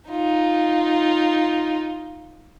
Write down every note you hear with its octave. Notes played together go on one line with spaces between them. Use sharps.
D#4 F4